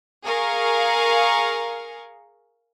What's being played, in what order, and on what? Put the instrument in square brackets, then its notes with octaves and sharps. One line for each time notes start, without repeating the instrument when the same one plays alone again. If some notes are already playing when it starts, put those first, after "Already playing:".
[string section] G#4 A#4 F5 C#6